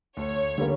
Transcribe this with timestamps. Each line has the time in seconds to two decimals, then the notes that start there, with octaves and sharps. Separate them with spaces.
0.17 D2 C#5
0.58 D3 G3 A#3